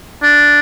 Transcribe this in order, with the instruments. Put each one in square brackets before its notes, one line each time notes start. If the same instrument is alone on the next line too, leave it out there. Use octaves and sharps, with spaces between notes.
[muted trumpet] D4